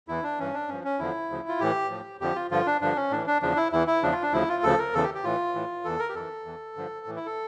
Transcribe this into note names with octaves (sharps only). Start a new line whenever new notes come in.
E2 E3 E4
D4
G2 E3 C#4
D4
G2 F3 C#4
C#4
E2 D3 F3 E4
D2 C#3 F3
F4
A2 E3 G4
A2 F3
F2 D3 F3 G4
F4
G2 D3 F3 F4
D4
G2 D3 F3 D4
C#4
A2 E3 D4
D4
E2 C#3 F3 D4
E4
E2 E3 E4
E4
E2 C#3 F3 D4
F4
D4
D2 C#3 F3 E4
F4
D2 C#3 F3 A4
A#4
E2 C#3 E3 A4
G4
G4
A2 E3 F4
A2 E3
E2 E3 A4
A#4
G4
F2 E3 A4
E2 E3
G2 D3 F3
A2 E3
E4
A4